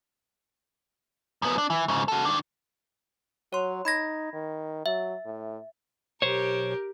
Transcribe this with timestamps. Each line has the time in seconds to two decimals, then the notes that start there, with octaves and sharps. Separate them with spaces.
1.42 F#2 B3
1.58 D4
1.70 E3
1.88 G#2 C#3
2.08 F#4 A4
2.25 D#3 D4
3.53 F#3 C#5 C6
3.85 D#4 B5 G#6 A#6
4.33 D#3
4.86 F#3 E5
5.25 A2
6.22 B1 G4 A#4 C5 C#5